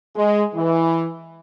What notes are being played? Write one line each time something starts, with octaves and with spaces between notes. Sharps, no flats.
G#3
E3